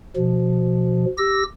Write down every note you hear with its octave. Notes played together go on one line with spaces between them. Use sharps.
B2 F3
G4 E6 A#6